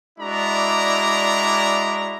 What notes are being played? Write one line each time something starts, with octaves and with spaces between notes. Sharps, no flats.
G#3 D4 E4 F#4 D5 A#5